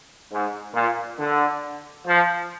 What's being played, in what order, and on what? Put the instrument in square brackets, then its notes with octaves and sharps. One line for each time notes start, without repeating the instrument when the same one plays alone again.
[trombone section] G#2
A#2
D3
F3